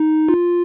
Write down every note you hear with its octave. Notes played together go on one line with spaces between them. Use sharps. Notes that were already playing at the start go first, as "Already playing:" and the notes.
Already playing: D#4
F4